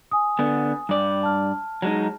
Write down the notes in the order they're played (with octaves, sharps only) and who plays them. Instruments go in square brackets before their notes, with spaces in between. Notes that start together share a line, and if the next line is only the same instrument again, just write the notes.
[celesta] G#5 D#6
[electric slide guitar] D3 B3
G2 D5
[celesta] A5 F6
[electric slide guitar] F#3 G#3 D#4